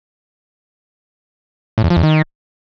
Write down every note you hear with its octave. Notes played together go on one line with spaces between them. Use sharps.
A2
E2
F3
E2
D#3